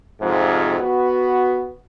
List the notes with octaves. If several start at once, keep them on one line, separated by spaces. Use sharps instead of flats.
F2 G#2 C3 F3
B3 F#4